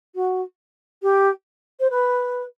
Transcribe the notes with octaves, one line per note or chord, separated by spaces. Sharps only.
F#4
G4
C5
B4